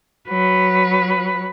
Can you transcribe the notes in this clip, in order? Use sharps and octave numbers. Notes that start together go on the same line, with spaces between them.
F#3 B4